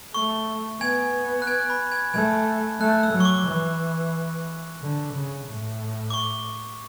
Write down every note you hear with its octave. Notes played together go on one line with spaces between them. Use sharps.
A3 C#6
B3 G#5 G#6
F#6
G#5 G#6
B5
G#5 G#6
A3 G#5 G#6
A3 F#6
E6
F#3
C#6
D6
E3
D3
C#3
A2
D6
C#6